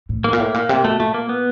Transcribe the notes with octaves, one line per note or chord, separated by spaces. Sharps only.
A2
G#2 A#3
A#2
A2 A#3
A#2
C3
B2 A3
A#2 A3
A#3
B3